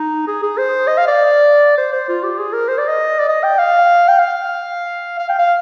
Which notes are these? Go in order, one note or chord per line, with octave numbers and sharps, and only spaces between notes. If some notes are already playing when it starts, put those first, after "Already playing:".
Already playing: D#4
G#4
G#4
C5
D#5
F5
D5
C5
C5
F4
G4
G#4
A#4
C5
D5
D#5
D5
D#5
G5
F5
G5
F5
F5
G5
F5